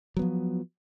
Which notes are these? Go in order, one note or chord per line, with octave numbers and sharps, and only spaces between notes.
F3 F#3 B3